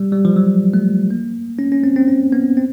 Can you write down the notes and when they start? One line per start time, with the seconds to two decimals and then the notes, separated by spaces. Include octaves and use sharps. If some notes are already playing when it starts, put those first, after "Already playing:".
Already playing: G3
0.12 G3
0.25 F3
0.36 F#3
0.74 A3
1.11 A#3
1.59 C#4
1.72 C#4
1.84 C4
1.96 C4
2.08 C#4
2.32 B3
2.57 C4